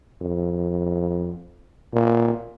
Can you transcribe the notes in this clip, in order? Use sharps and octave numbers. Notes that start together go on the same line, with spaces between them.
F2
A#2